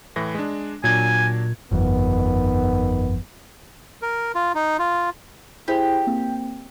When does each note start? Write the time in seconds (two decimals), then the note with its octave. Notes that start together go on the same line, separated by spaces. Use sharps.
0.16 A2 E3 A#6
0.35 G#3 D4
0.84 A#2 F#3 D4 D5 G#5 G#6
1.71 G1 F2 D#3 B3
4.02 A#4
4.35 F4
4.55 D#4
4.79 F4
5.68 E4 G4 G#4 C5
6.07 A#3 C4